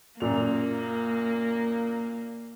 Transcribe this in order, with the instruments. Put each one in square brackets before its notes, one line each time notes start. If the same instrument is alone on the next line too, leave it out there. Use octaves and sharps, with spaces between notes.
[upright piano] F#2 A#2 F7 [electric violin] A#3